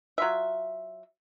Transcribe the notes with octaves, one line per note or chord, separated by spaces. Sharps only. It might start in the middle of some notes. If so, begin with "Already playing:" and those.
F#3 F4 E5